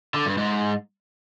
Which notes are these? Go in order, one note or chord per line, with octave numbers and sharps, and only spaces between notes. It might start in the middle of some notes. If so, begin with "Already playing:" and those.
D3
G2
G#2